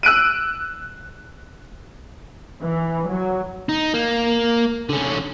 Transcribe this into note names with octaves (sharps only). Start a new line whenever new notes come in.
E6 F#6 D7 D#7
E3
F#3
D#4
A#3
D3 C#4